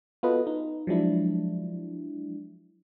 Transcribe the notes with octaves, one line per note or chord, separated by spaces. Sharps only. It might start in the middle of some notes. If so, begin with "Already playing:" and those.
B3 F4 F#4 A4 B4 D#5
D#4
F3 F#3 G#3 D4 E4